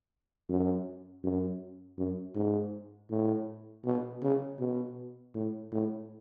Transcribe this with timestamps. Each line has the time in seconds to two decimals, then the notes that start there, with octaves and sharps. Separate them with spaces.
0.49 F#2
1.24 F#2
1.98 F#2
2.35 G#2
3.10 A2
3.85 B2
4.22 C#3
4.60 B2
5.35 A2
5.72 A2